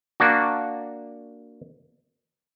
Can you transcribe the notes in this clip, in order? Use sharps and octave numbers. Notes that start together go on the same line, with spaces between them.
A#3 D4 F#4